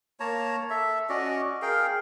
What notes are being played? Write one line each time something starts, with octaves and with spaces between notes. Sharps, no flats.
A#3 C#5 A5 A#5
A4 E5
C#4 F#4 D5 D#5
G#4 A#4 F5 G5